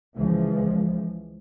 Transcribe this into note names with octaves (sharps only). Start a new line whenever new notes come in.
C#2 E3 F3 G#3